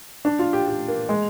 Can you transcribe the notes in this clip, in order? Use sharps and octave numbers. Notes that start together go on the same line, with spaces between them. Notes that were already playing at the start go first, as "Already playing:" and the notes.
D4
F4
G4
G4
A#3
G#3